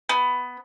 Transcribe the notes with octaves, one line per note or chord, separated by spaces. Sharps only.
B3